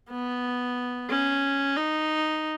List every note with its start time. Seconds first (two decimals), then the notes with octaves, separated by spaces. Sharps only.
0.11 B3
1.11 C#4
1.77 D#4